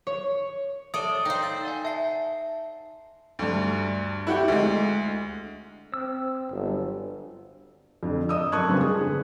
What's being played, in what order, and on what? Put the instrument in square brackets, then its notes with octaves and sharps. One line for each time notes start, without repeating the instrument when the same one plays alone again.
[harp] C#5
[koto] A4 D5 [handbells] C#5 E5 [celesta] D#6
[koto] D#4 C5 [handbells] F5 G5
[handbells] E6 A6
D5 F#5 G#5
[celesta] E5 [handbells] A5 C7
[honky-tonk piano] D2 G2
E4 F#4 G4
D2 G#3
[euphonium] C4 [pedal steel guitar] E6
[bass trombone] G1 [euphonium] F#3
[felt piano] F2 D3
D#5 D#6 E6
F#2 A5 C#6 D#6 F#6 G#6
C#3 G3 C4 D4 F4 B4
G#4
D3